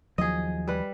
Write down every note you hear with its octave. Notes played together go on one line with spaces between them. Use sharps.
D#2 F3 F#3 G#4 D#5
G3 B4